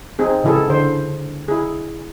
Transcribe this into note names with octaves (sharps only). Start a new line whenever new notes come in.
C4 D#4 G#4
C#3 E3 E4 G#4 A4
D3 C5
E4 G#4